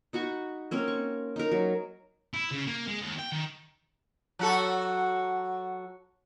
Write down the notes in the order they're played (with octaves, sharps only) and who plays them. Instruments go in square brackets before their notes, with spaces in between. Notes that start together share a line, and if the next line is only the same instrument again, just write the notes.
[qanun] D#4 F#4 B5 C#6
A#3 C4 C#4 A#4
C#6
D#4 A#4
F#3
[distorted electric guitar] E4
C#3
A#3
G#3
D#2
G5
D#3
[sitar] F#3 F#4 A4